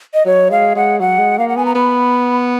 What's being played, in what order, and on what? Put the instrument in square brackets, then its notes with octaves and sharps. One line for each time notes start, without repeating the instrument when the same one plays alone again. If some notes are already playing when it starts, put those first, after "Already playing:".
[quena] D#5
[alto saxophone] F#3 [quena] C#5
[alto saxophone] G#3 [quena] F5
[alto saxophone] G#3 [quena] F#5
[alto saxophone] F#3 [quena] F#5
[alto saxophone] G#3
[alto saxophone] A#3 [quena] F5
[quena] F#5
[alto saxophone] B3 [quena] G#5
[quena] A#5
[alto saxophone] B3 [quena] B5